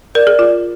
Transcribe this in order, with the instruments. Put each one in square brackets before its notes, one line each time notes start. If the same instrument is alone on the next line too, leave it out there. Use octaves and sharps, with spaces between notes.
[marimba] A#4 [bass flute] D5
[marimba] G#4
F4